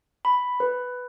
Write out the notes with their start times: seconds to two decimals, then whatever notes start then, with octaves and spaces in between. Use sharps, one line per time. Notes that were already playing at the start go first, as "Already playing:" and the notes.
0.25 B5
0.60 B4